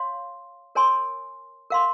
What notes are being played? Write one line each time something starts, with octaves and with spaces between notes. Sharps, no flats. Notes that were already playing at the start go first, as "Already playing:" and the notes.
Already playing: C#5 F5 C6
A#4 C#5 G#5 C6
A#4 F5 C6